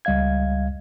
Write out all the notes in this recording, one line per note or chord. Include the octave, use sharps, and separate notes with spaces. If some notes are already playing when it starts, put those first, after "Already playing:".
C#2 G3 D#5 F5 G#6